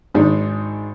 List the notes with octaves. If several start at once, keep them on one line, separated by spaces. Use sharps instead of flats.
G#1 G#2 D#3 G#3 D4 D#4